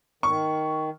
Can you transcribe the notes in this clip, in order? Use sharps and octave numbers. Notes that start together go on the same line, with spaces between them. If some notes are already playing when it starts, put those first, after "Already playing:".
D#3 C#6